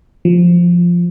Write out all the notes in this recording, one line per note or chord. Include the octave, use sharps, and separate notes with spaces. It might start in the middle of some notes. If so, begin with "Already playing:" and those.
F3